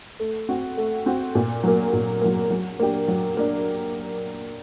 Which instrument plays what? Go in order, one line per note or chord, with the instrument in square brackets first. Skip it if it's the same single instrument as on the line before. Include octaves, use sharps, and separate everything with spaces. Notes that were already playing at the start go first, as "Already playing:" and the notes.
[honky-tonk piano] A3
C4 F#4
A3
C4 F#4
A#2
F#3 A#3
A#2
F#3 A#3
F#3
A#3 D4 G4
F#3
A#3 D4